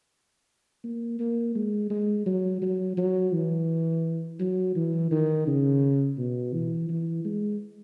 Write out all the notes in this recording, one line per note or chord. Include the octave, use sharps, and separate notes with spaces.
A#3
A#3
G#3
G#3
F#3
F#3
F#3
E3
F#3
E3
D#3
C#3
B2
E3
E3
G#3